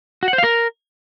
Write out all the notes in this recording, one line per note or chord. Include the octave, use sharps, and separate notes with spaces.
F#4
F#5
C5
F5
A#4